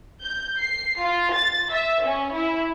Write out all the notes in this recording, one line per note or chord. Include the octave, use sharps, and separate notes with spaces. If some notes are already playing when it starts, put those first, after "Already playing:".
G6
C7
F4
A6
E5
C#4
E4